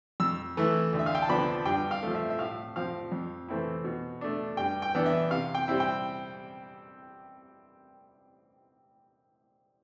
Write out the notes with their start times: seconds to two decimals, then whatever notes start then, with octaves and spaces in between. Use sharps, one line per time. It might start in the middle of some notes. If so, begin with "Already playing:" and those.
0.20 F2 E6
0.57 E3 A3 E4
0.93 D2
0.99 E5
1.06 F5
1.15 G5
1.22 A5
1.29 D3 F3 B3 D4 B5
1.65 G2 G5
1.91 F5
2.03 F3 A3
2.15 E5
2.30 E5
2.38 A2 F5
2.76 F3 C4 F5
3.12 F2
3.48 E3 A3 C4 E4
3.84 B2
4.21 A3 D4
4.57 G2 G5
4.82 G5
4.95 E3 B3 D4
5.06 E5
5.31 C3 F5
5.55 G5
5.68 G3 C4 E4
5.80 G5